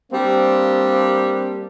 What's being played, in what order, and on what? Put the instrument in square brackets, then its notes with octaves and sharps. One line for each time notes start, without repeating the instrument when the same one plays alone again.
[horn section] G3 A#3 C4 D4